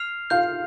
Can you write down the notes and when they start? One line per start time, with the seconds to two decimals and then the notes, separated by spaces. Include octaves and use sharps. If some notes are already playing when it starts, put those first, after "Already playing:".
Already playing: F6 C7 F7
0.30 F4 F5 G6